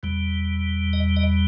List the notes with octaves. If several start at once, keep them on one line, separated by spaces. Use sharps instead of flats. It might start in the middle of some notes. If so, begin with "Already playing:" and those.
E2 B2 G3
D#5
D#5